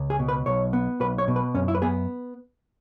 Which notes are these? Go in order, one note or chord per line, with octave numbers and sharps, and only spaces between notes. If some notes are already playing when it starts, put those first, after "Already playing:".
Already playing: C#2
G#4
B2
B4
B1 C#5
B3
B1 B4
C#5
B2
B4
F#2 C#4
E4
B4
B3 G#4